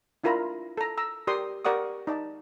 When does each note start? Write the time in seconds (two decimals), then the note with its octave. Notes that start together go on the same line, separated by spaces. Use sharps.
0.24 D4 E4 F4 A#4 A#5 B5
0.77 A4 A#5
0.98 A#5 E6
1.27 G4 A#4 D5 C6 D#6
1.65 G4 A#4 D5 F#5 C#6 D#6
2.07 D#4 D5 A5